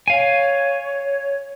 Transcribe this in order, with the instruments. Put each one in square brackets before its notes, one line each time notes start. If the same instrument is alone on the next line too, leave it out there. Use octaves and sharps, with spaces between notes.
[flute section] C#5 [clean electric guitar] F5 G#5